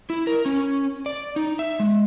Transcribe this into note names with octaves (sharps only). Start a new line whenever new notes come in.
E4
A#4
C#4
D5
D#4
E5
G#3